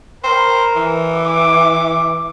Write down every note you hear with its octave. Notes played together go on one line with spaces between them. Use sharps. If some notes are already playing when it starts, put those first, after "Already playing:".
A#4 C5
E3
D6